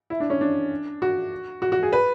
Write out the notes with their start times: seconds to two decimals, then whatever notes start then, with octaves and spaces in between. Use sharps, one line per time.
0.10 E4
0.20 D4
0.30 C#4
0.41 D4
1.02 F#4
1.62 F#4
1.72 F#4
1.83 G#4
1.93 B4